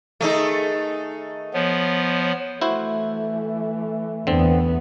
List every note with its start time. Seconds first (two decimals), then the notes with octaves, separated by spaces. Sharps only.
0.21 D#3 A3 D#4 G#4 A4
1.54 F3 B3 C#5
2.61 E3 A3 E4 F#4 C5
4.27 E2 D3 B3 C4